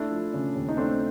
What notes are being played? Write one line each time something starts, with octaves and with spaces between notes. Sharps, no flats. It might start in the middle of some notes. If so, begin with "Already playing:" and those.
Already playing: A3 D4 E4
F3
C#3
D#2
D#4
A3 C4 D4